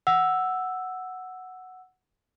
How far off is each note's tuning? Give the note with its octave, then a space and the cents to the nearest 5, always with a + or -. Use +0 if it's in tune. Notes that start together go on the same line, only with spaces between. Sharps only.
F#5 +0 E6 +0